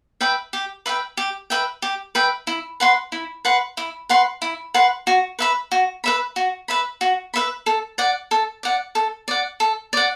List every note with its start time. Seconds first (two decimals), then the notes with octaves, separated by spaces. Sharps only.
0.21 B4 E5 G5
0.53 G4
0.86 B4 E5 G5
1.17 G4
1.50 B4 E5 G5
1.82 G4
2.15 B4 E5 G5
2.47 E4
2.80 B4 F#5 C6
3.12 E4
3.45 B4 F#5 C6
3.77 E4
4.09 B4 F#5 C6
4.42 E4
4.74 B4 F#5 C6
5.07 F#4
5.39 B4 E5 B5
5.72 F#4
6.04 B4 E5 B5
6.36 F#4
6.68 B4 E5 B5
7.01 F#4
7.34 B4 E5 B5
7.66 A4
7.98 D5 F#5
8.31 A4
8.63 D5 F#5
8.95 A4
9.28 D5 F#5
9.60 A4
9.93 D5 F#5